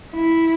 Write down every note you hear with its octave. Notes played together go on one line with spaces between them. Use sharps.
E4